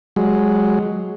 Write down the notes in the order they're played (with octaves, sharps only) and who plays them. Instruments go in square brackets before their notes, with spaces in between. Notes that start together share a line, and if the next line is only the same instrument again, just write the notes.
[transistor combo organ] F#3 G#3